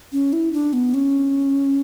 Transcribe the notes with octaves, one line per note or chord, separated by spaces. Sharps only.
C#4
E4
D4
B3
C#4